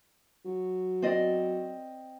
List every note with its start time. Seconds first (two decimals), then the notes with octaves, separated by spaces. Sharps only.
0.45 F#3
1.02 C4 D5 D#5